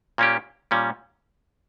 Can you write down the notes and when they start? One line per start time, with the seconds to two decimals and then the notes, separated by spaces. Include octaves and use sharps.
0.18 A#2 A#3 C#4 G4
0.71 A#2 G3 C#4